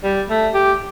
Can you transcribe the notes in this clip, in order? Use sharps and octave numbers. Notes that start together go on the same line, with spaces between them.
G3
A3
G4